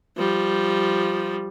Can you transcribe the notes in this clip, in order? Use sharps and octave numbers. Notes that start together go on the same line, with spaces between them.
F3 G3